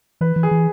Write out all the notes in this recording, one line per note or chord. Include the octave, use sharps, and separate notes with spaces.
E3 B4
E3
G#4
E3